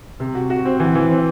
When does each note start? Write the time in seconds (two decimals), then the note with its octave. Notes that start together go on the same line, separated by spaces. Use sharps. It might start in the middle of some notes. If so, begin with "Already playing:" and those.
0.20 C3
0.35 F#4
0.50 F#4
0.65 C4
0.80 E3
0.95 E3
1.10 C4